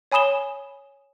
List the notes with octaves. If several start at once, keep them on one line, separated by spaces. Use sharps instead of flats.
C#5 G#5 B5 D#6 E7 G7